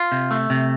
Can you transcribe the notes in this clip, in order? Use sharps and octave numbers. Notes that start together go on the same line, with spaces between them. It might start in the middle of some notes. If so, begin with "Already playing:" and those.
Already playing: F4
C3
A3
C3